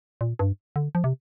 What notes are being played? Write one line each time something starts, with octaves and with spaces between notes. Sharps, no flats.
A#2
G2
D3
F3
C3